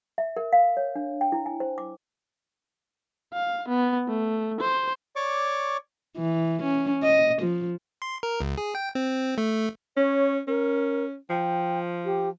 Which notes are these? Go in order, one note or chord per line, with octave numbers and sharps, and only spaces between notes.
E5
A#4
F5
C#5
D4
G5
E4
G#5
C5
D6
F5
B3
A3
C5
C#5 D5 C#6 D6
E3
C#4
D#5
F3
C6
A#4
C#2
G#4
G5
C4
A3
C#4 C#5
C#4 A#4
F3 G5
G4